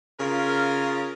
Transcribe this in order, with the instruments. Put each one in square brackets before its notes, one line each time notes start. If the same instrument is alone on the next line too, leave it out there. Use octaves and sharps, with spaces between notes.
[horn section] C#3 F4 A#4